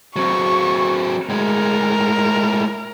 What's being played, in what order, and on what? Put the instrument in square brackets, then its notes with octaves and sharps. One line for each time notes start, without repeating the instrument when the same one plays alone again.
[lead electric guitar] F#3 C4 [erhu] C#6
[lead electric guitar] A2 G#3 [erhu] A#4